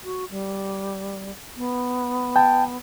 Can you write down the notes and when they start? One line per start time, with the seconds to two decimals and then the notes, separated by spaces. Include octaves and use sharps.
0.04 F#4
0.31 G3
1.57 B3
2.36 G5 A5